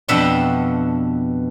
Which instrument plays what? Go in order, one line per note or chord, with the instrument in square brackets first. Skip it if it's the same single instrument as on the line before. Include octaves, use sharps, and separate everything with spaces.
[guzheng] F2 B2 D4 E5 F#5 G5